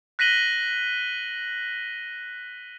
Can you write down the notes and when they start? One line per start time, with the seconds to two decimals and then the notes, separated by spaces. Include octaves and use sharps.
0.19 F#6 A#6 B6 D#7 F#7 G7